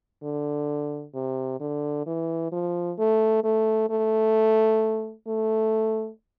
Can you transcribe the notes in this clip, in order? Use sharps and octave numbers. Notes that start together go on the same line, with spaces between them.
D3
C3
D3
E3
F3
A3
A3
A3
A3